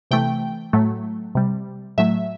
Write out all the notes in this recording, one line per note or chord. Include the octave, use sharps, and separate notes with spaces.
C3 E3 A3 G5
A2 F#3 A3
C3 G3
A2 F#3 A3 E5